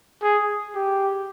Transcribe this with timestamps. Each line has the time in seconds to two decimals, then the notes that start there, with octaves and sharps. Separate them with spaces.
0.22 G#4
0.75 G4